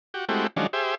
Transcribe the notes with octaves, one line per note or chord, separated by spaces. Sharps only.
F#4 G4
G#3 A3 C4 E4 F#4 G4
D#3 F3 F#3 G#3 C#4 D4
G4 G#4 C5 E5